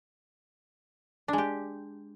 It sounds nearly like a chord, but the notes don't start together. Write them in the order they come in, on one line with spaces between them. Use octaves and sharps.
D4 G#3 G4